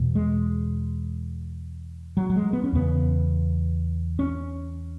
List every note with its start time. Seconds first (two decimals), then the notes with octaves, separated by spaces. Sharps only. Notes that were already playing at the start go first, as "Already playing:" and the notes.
Already playing: E2 B2
0.15 G#3
2.17 F#3
2.30 F#3
2.36 G#3
2.53 B3
2.64 C#4
2.72 E2 C#3 B3
4.19 C#4